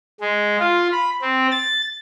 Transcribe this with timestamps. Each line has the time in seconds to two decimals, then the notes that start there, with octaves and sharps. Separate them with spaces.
0.21 G#3
0.59 F4
0.92 B5
1.22 C4
1.51 A6